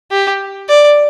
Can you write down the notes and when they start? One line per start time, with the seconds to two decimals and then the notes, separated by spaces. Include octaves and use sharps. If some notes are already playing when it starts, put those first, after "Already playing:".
0.11 G4
0.69 D5